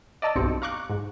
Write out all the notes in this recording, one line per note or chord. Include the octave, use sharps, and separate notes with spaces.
D5 D#5 A5 E6
B1 G2 C4 C#7
F5 A#5 C#6 D6 F#6
G#2